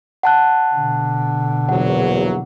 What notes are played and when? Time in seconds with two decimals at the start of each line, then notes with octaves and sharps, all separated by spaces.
0.23 F#5 A5 F#6
0.75 B2 D3
1.69 A#1 E2 F#3 F#5